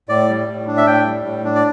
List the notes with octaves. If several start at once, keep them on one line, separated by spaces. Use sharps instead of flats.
A2 D5
G3
A2
D4
E5
A2 G5
G3
A2
D4
D5